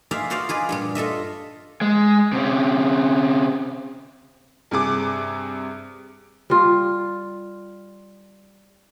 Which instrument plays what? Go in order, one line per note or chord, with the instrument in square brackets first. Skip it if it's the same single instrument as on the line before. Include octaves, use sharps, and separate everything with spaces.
[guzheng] G#4 C5 D5 E5 F5
F4 F#4 C5 D5 D#5 F5
F4 G#4 B4 D5
G2 A#2 G3
F4 A4 D#5 E5
[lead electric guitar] G#3
C3 C#4
[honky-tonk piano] G2 C3 G#4 D6
[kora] G3 F4